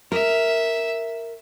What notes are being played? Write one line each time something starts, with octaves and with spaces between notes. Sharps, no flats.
A#4 E5